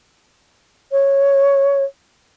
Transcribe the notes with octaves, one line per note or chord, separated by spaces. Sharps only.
C#5